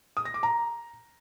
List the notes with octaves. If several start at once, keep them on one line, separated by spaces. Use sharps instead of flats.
D#6
A#6
D6
A#5